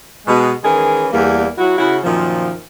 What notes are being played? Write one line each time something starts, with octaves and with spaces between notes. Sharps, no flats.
B2 G#3
D#3 E3 G#3 C#4 G#4 A#4
E2 G3 A#3
F#3 E4 F#4
C#3 E4 F#4
F#2 A#2 D#3 F3